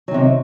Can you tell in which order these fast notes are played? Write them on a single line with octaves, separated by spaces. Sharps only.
F#3 D#3 C3